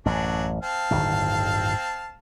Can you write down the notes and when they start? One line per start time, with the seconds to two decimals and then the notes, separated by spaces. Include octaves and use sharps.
0.06 A1 F#2 F#3 D4
0.63 C4 F5 A5
0.91 D1 G1 D#3